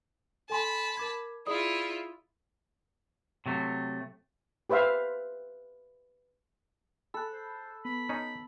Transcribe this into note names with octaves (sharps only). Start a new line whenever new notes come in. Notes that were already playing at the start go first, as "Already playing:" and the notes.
A4 G#5 A5 B5 C6
A#4 D6 G#6
E4 F4 G#4 D5 D#6
C3 F#3 A3
G4 B4 C5 E5 F5
A4 B5 F#6
C5
B3 B5
C#4 D#4